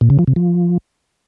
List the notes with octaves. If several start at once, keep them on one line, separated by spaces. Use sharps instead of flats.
A#2
C#3
F3
C3
F3